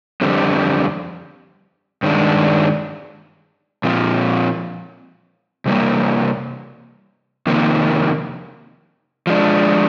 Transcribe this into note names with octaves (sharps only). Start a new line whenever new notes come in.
F2 D3 G3 C4
G2 D#3 G#3 D4
A#2 F3 C4 F4
C3 G3 A#3
F2 C3 D#3 A#3
F3 G#3 D4